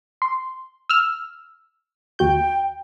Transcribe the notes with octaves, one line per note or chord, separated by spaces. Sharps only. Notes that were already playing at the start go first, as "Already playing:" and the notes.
C6
E6 F6
D#2 F#4 G5 G6